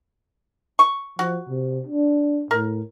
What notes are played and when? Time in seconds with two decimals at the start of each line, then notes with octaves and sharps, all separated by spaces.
0.79 C#6
1.19 F3 F#4
1.49 C3
1.87 D4
2.51 A2 A#4